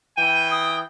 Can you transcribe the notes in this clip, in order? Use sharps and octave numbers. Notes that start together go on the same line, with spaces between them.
E3 G5 D#7
D#6